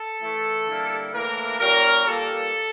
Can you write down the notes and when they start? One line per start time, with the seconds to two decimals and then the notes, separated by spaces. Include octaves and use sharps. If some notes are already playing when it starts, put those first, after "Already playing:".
Already playing: A4
0.21 E3 A3 E4
0.67 D3 G3 A#3 E4
1.13 A2 E3 A#3 D4 A#4
1.60 A#2 G3 C#4 A#4
2.05 A#2 G3 A#3 A4